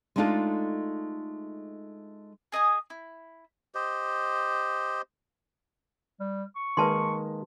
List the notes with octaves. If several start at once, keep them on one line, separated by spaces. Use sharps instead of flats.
G#3 A3 D4 D#4 F4 A4
G#4 D#5 G#5 D#6
E4
G4 C5 D#5
G3
C#6
D#3 G#3 A#3 B4 A5 C6